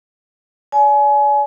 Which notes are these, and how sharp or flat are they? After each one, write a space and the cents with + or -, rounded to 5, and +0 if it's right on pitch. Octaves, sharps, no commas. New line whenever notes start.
D5 -35 G#5 +30